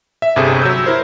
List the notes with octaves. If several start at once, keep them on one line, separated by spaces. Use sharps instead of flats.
E5
G1 G2 C3 G#4 A4
F#3 E6 G6
E4 A#4 C5